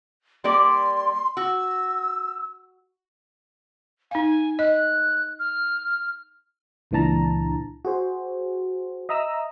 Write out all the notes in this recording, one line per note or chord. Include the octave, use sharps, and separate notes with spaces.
G3 A#3 D5 C6
F#4 E6
D#4 F5 G#5
D#5 F#6
F6
C#2 A#2 E3 D4 A5 A#5
F#4 G#4 C5
D#5 E5 A#5 D#6 E6